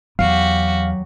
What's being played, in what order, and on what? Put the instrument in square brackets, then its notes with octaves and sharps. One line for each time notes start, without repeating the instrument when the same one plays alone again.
[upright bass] E2 [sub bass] F#3 [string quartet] F#4 G4 [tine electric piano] F5